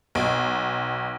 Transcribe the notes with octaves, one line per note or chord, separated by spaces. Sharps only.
B1